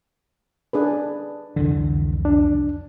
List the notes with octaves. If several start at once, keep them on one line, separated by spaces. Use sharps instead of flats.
D4 G#4 B4
C2 F2 D3 E3
D4